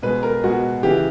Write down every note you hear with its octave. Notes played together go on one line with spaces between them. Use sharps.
B2 G#3 B4
A#4
B2 G#3 F#4
C#3 E3 G4